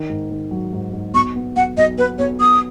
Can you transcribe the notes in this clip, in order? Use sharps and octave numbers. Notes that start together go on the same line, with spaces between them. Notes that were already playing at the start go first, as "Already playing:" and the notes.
Already playing: D#3
G#2
D#3
F#3
G#2
G#2
B1 C#6
B3
B1 F#5
B1 D#5
B3 B4
B1 C#5
B3 D#6